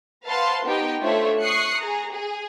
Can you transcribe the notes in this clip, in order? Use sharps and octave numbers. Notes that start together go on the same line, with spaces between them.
B4 C5 F5 F#5 A5 C6
B3 D#4 G4 G5
A3 D4 F4 C5 C#5 E5
C#6 D#6 F#6 C7 C#7
G#4 A#5
G#4